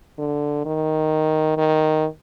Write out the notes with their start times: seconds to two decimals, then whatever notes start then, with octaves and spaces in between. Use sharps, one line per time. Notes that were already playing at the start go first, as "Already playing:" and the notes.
0.18 D3
0.66 D#3
1.57 D#3